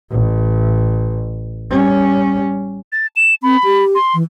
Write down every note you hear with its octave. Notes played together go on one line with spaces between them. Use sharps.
A1
G3 C#4
A6
E7
C4 B5
G4
C6
E3